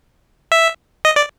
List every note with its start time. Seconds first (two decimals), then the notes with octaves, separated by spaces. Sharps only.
0.52 E5
1.05 D#5
1.16 D5